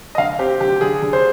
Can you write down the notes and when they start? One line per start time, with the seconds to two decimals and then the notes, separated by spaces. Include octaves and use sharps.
0.15 D#5
0.18 D3 F5
0.39 C4 G4
0.61 D3 G4
0.81 D3 G#4
1.02 D3
1.13 C5